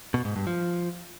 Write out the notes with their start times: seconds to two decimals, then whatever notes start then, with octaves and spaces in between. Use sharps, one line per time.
0.14 B2
0.25 G#2
0.36 G2
0.47 F3